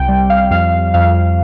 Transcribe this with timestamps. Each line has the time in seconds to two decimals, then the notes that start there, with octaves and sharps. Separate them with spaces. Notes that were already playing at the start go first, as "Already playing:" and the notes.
Already playing: C2 G5
0.08 G3
0.30 F5
0.51 F2 F5
0.94 F2 F5